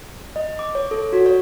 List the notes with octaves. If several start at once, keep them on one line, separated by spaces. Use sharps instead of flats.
D#5
D6
C#5
A4
F#4
C#5